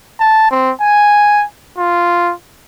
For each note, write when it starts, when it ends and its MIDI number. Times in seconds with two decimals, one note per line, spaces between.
0.20 0.49 81
0.51 0.71 60
0.81 1.44 80
1.78 2.32 65